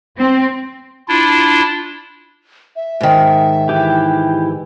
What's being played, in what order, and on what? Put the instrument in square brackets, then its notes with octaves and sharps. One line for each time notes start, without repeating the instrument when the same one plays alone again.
[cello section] C4
[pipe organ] D4 E4 F4
[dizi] E5
[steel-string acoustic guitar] G#2 D#3
[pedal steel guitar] E3 G4